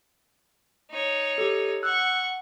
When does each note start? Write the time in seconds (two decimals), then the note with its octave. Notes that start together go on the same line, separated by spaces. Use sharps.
0.91 D#4 C#5
1.38 G4 A4
1.83 F#5 C#6 E6 F#6